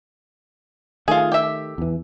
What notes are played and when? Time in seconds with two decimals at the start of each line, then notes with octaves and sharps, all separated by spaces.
1.08 D#3 A3 F4 G#4
1.32 G4 E5
1.78 E2 E3